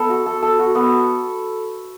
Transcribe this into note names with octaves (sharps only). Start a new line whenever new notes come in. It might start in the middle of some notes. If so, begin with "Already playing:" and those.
Already playing: B3 A4
F#4
A4
A4
F#4
B3